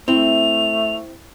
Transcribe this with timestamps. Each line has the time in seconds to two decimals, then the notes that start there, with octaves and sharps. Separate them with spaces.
0.08 A3 C4 E4 F7